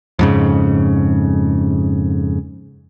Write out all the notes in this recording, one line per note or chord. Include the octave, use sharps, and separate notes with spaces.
F2 G#2 C#3